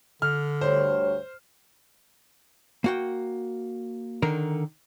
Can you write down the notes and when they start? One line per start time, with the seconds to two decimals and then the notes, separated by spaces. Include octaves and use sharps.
0.22 D3 F6
0.61 D2 G2 C5 C#5
2.84 A#3 F#4 G5
4.22 D3 D#3 A#4